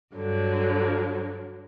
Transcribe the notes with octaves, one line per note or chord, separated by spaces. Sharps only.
G2 D3 F#3